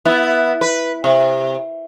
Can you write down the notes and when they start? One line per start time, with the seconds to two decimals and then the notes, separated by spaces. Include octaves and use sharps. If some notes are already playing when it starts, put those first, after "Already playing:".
0.05 B3 E4
0.61 B4
1.04 C3